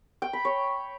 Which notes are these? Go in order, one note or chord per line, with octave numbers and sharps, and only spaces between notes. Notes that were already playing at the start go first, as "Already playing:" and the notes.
G5
B5
C#5